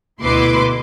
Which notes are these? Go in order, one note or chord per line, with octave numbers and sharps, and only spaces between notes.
D2 B2 E4 B4 C6 D6